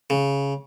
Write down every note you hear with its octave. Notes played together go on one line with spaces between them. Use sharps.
C#3